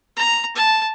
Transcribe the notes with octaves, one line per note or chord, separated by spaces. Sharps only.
A#5
A5